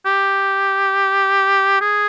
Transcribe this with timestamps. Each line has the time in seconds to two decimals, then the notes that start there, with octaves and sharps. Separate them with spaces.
0.06 G4
1.81 G#4